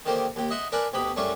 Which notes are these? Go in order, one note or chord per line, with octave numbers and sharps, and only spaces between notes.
D3 D#3 A#3 G4 C5
D#2 G4
D#5 E5 F#5 C6 D#6
D4 A#4 B4 D5 G#5
D2 B2 G4 B5 D#6
F#2 G3 A3 C#4 D4